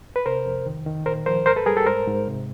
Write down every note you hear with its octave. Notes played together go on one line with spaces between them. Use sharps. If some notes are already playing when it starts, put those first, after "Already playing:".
B4
C3 A#4 C5
F2
D#3
D#3
A#2 A#4 C5
F3 A#4 C5
G#2 A#4 C5
A4 B4
G3 G#4 A#4
G4 A4
G#2 A#4 C5
G#2
C3